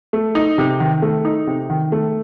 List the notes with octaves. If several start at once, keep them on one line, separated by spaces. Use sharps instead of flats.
A3
D#4
C3
D#3
A3
D#4
C3
D#3
A3